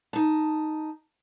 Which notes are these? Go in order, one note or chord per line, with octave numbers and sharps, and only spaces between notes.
D#4 A5